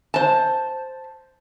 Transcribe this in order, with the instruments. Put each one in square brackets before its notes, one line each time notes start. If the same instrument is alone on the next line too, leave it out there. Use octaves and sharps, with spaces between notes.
[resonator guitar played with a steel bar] C5 A5